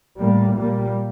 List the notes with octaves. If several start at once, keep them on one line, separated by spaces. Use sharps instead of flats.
A2 G3 A#3
A#2 G3 A#3